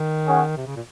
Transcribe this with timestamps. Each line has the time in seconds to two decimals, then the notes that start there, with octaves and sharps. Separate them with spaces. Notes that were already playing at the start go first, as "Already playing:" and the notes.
Already playing: D#3
0.27 C#4 G#4 C#5 F#5
0.57 C3
0.67 C#3
0.76 A#2